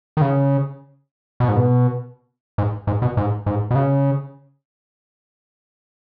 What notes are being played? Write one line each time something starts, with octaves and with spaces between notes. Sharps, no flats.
D#3
C#3
B2
G#2
B2
G#2
G#2
B2
G#2
G#2
B2
C#3